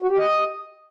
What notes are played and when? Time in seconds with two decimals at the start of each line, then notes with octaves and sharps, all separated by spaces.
0.02 F#4
0.10 G4
0.18 D#5